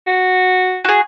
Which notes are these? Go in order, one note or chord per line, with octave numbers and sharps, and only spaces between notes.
F#4
F#4 G#4